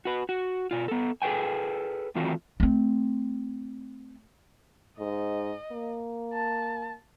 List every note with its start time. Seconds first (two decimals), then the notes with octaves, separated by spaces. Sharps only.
0.05 F#4 B4
0.29 F#4
0.71 B2 F4
0.88 B3 A4
1.22 G#4 A4 B4 G5 G#5
2.15 D#3 E3 A3 C4 F4 F#4
2.60 A3 C4
4.99 G#2 D#5
5.72 A#3
6.33 A5